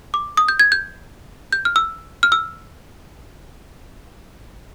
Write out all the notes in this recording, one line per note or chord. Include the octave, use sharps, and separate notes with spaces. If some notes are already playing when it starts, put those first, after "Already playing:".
D6
D#6
G6
G#6
G6
G6
F6
E6
F6
E6